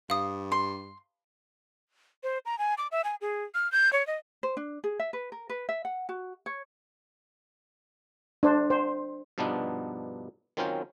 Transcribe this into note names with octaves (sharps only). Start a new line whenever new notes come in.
G2 F5 D#6
C6
C5
A#5
G#5
D6
E5
G#5
G#4
F6
G6
C#5
D#5
C5
D4
G#4
E5
B4
A#4
B4
E5
F#5
F#4
C#5
D4 C5
C5
G2 B2 F3 B3 D4 D#4
D#3 F#3 C4 C#4 F4 C5